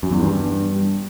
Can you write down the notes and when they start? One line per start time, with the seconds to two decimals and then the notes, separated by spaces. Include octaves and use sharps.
0.03 F#2
0.11 E2
0.20 G2